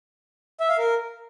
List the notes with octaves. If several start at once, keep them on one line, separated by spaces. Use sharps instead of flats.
E5
F5
A#4